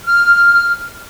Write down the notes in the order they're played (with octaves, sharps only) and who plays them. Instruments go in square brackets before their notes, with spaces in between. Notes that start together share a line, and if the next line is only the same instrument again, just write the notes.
[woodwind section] F6